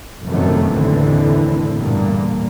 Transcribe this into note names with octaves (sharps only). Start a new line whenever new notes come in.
F1 F#2 C3 D#3 A3 B3
F1 D#2 A2 D3 E3 C4
E2 G2 A#2 D3 A#3